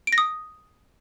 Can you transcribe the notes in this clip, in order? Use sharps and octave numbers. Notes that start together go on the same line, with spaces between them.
D7
A#6
D#6